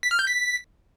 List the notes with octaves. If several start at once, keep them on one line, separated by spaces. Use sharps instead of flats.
B6
F6
G6
B6